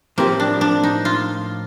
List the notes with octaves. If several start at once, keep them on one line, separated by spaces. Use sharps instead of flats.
A2 F3 A#3 C4 G4
D4
D4
D#4
F4